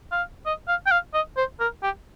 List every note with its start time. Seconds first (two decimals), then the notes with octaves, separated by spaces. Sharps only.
0.12 F5
0.46 D#5
0.68 F5
0.86 G5
0.91 F5
1.14 D#5
1.37 C5
1.60 A#4
1.83 G4